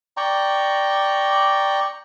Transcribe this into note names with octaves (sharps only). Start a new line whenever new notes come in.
D5 G5 A#5 C#6